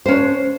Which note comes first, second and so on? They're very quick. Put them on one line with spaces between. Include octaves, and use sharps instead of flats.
C5 C#4 D4